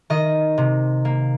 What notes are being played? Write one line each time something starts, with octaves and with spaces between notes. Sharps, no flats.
D#3 D#5
C3
A#3